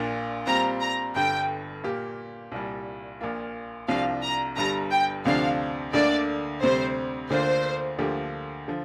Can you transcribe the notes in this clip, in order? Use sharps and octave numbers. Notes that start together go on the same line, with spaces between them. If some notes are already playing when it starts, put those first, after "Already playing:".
Already playing: A#1 A#2 A#3 D4 F4
A#2 G3 C4 F4 A#5
A#5
G1 G2 D3 G5
A#2 A#3 G4
C2 A#2 G3
A#1 A#2 A#3 F4
C2 C3 F3 D4 F4 F5
A#5
G1 G2 G3 A#5
G5
D2 C3 F3 D4 F5
D2 D3 A#3 D4 D5
D2 C3 G3 C5
D2 D3 A#3 D4 F4 C5
D2 D3 F3 A#3 G4
D3 F3